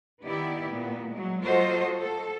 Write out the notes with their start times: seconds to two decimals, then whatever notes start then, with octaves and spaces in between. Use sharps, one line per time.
0.24 D#3 B3 E4 G4 D5
0.69 A#2 B3
1.13 F#3 G#3
1.45 F#3 F4 F#4 A4 C5 D#5
2.01 A4